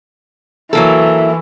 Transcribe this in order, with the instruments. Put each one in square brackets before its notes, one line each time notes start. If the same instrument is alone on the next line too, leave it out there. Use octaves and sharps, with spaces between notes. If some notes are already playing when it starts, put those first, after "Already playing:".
[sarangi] E3 [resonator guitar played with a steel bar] F#3 A#3 A4